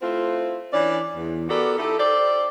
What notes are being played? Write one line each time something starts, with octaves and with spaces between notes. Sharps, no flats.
A3 C4 E4 F4
E3 C#4 D4 D5
E2
B3 F#4 G4 A4 A#4 D5
D#4 E4 G4 A4
G4 A4 C5 D5